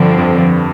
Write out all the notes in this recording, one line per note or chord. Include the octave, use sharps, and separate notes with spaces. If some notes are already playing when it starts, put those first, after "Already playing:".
Already playing: G2 D3 F3 C4
F2